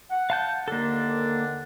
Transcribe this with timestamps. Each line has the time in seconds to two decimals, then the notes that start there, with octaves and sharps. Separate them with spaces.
0.10 F#5
0.30 F5 A5 G6
0.68 D#2 D3 A#3 D4 A4